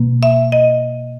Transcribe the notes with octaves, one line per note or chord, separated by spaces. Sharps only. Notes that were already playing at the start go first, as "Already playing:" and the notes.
Already playing: B2 A#3
E5
D#5